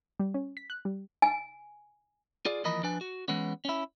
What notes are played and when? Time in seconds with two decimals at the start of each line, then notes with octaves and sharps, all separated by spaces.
0.20 G3
0.34 C#4
0.57 B6
0.70 F#6
0.85 G3
1.22 G#5
2.45 F4 G#4 D5
2.64 D#2 E3 F3 A#4 D#5 B5
2.83 F3 D4 B4 G#5
3.01 F#4
3.28 E3 G#3 B3 C#4
3.65 C#4 E4